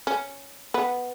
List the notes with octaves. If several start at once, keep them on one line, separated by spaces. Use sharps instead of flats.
C#4
B3